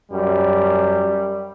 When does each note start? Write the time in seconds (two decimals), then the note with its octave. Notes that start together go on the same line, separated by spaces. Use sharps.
0.12 F#2 G3